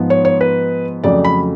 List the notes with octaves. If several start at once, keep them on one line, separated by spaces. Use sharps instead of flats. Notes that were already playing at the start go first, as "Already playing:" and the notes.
Already playing: G#2 F3 B3
C#5
C#5
B4
F2 C#3 F#3 A3 D5
B5